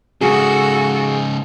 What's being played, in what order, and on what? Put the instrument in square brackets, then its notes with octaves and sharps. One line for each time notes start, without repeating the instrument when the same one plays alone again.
[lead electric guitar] G#2 C#3 [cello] F#4 A4 [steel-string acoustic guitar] G#4